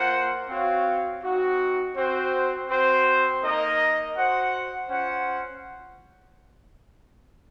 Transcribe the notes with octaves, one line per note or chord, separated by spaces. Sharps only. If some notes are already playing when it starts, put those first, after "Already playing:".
Already playing: A#3 F4 C5 F#5
C4 F#4 C#5 F5
C4 D#4 F#4
C4 F#4 C5
C4 F#4 C5
A#3 D#4 A#4 D#5
F#4 C5 F#5
C#4 F4 C5 F#5